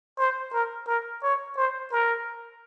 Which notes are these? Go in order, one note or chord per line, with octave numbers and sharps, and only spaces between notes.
C5
A#4
A#4
C#5
C5
A#4